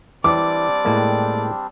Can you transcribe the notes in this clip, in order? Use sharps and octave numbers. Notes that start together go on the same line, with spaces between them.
E3 G3 C4 D4 D5 D6
A2 G#3 A#3